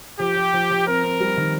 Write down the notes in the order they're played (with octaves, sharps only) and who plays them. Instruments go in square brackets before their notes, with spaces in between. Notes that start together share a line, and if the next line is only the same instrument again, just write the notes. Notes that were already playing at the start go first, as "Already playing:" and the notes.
[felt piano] F3 [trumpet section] G4
[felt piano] F3
F3
F3
[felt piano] C4 [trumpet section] A#4
[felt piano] C4
G3
D#3